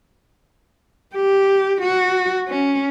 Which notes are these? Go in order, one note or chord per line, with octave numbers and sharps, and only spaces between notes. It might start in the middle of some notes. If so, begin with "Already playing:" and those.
G4
F#4
C#4